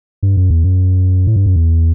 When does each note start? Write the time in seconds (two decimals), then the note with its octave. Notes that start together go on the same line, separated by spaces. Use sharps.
0.23 G2
0.37 F#2
0.50 E2
0.64 F#2
1.27 A2
1.36 G2
1.46 F#2
1.56 E2